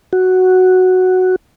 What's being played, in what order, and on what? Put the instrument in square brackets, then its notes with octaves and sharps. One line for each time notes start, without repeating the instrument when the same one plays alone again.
[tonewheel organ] F#4